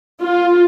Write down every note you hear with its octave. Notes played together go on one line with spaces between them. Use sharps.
F4